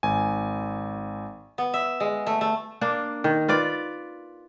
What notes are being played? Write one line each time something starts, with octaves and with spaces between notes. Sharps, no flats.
G#1 G#5
B3
E5
G#3
A3
A3
A#3 D4
D#3
F4 B4 D5